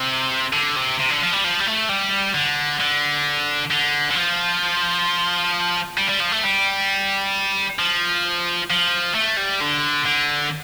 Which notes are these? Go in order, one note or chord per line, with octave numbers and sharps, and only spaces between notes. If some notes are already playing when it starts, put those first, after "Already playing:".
Already playing: C3
D3
C3
C3
D3
F3
G3
F3
G3
A3
G3
D3
D3
D3
D3
F3
G3
G3
F3
A3
G3
F3
F3
A3
G3
D3
D3